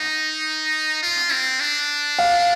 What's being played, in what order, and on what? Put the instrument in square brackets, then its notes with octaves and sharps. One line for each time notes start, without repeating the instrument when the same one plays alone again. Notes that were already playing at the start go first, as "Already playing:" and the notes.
Already playing: [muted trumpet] D#4
F4
C4
D4
[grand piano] F5